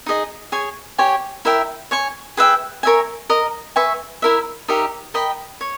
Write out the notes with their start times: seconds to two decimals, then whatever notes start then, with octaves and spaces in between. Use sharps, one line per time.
0.06 D#4 G#4 D#5
0.52 G#4 C#5 G#5
0.98 G4 C#5 G#5
1.45 E4 A#4 E5 G5
1.91 C#5 G#5 C#6
2.37 G#4 B4 E5 G5
2.83 A#4 C#5 E5 G#5
3.29 A#4 D#5 A#5
3.76 B4 E5 G#5 C#6
4.22 E4 A#4 E5
4.68 D#4 G4 A#4 E5
5.14 A#4 D#5 G5 B5
5.61 C#5